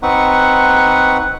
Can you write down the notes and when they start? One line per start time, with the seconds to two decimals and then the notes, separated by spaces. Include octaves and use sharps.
0.03 C4 D#4 B4 F#5 C#6